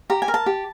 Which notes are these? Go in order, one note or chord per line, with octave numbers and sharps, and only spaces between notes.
G4 A#5
G#5
A#4
A5
G4